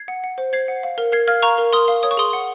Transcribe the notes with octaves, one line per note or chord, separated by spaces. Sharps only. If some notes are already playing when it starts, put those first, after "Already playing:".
Already playing: G#6 C7
F#5
F#5
C5
C5 G#6 C7
F#5
F5
A#4
A#4 G#6 C7
F5 F6 G#6
F5 A#5 C#6
A#4
A#4 C6 D#6
F5
C#5 D#6
C#6
G#4 C6 D#6
F#5